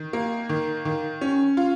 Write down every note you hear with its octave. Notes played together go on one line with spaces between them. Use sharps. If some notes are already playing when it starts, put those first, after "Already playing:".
Already playing: D#3
A#3
D#3
D#3
C#4
F4